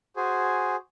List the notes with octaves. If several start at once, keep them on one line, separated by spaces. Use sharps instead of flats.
F#4 G#4 C5 G#5